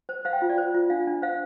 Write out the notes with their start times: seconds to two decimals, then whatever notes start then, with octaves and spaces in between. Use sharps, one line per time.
0.09 C5
0.25 C5 F5
0.33 G5
0.41 F4 F5
0.49 D5
0.58 C5
0.74 F4
0.90 D4 F5
1.07 D4
1.22 C5 F5